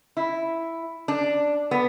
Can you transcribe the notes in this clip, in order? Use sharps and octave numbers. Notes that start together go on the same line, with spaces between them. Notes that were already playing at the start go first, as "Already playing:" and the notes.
E4
D4
B3